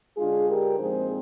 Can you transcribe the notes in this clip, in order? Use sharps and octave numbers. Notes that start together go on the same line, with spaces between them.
D3 G#3 D4 F4 G#4
G4 A#4
A#2 F3 G#3 C4 D#4 G#4 C5